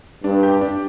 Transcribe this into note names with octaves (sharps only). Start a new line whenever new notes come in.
G2 D4
G4
D4